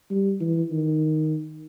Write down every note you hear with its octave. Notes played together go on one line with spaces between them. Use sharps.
G3
E3
D#3